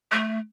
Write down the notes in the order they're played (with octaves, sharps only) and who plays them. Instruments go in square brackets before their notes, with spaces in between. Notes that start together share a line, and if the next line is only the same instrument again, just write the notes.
[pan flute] A3